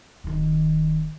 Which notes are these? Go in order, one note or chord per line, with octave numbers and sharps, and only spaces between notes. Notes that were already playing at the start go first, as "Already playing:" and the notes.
D1 D#3